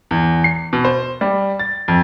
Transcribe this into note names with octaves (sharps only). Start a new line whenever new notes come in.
E2
C7
B2
C5
G3
A6
F2